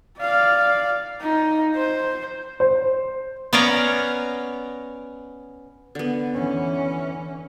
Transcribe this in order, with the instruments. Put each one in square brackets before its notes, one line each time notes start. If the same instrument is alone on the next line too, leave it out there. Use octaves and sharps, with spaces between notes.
[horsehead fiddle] D5 F5
D#4
C5
[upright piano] C5
[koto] B3 C#4 C#5 D5 F5 A#5
[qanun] D3 B3
[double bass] E3 C#4